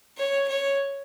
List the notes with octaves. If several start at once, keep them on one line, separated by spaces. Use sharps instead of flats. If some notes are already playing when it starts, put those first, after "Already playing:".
C#5
C#5